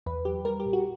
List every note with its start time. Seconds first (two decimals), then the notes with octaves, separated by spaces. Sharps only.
0.06 E2 B4
0.25 F#3 G4
0.45 G3 A#4
0.60 G4
0.66 A#1
0.73 F#4